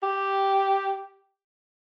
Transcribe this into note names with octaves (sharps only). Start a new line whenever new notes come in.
G4